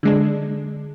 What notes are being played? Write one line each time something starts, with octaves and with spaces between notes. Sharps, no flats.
D3 G#3 D4